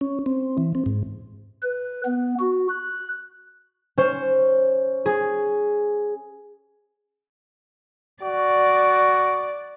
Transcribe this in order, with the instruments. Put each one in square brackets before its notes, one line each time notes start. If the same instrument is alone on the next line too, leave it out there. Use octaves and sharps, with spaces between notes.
[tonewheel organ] C#4
C4
E3
C4
G#2
[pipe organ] B4
B3
F#4
F#6
[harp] C#4 C5
G#4
[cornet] F#4 [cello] D5